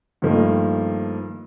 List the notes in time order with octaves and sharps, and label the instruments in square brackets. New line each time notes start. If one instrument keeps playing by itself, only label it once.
[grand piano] G2 D#3 F3 A3 A#3